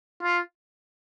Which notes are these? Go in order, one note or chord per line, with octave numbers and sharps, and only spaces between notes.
F4